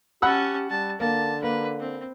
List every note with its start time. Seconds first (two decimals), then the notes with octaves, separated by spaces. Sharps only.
0.22 C#4 G4 F#5 A5 B5 E6
0.70 G3 A5
1.00 D3 A#3 A5
1.43 A#3 B4
1.79 C4